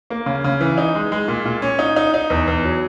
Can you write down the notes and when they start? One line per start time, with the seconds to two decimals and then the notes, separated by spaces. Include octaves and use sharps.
0.10 A#3
0.26 C#3
0.44 C#3
0.61 E3
0.78 D#4
0.95 G#3
1.12 G#3
1.28 A#2
1.45 A#2
1.62 C#4
1.79 D#4
1.96 D#4
2.14 D#4
2.30 E2
2.48 E2
2.64 F#3